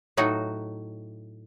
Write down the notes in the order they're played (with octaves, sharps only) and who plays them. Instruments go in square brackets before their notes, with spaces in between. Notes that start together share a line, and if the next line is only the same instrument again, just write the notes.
[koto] A2 F#3 D#4 F#4